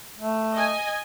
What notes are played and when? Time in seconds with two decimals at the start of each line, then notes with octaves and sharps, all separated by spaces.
0.19 A3
0.55 D#5 G#5